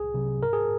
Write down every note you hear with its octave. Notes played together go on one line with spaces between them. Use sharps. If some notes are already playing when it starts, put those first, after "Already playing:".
Already playing: C2 G#4
C3 F#3
G#2 A#4
G#4